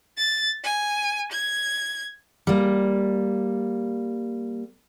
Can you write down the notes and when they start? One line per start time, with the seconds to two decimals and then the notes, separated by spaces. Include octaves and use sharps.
0.17 A6
0.63 G#5
1.31 G#6
2.47 G3 A#3